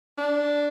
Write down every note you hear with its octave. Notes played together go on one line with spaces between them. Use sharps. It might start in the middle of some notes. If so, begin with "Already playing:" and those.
D4